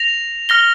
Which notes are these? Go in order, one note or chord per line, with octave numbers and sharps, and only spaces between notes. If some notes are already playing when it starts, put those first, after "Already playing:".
Already playing: A#6 F7
F6 A#6 G7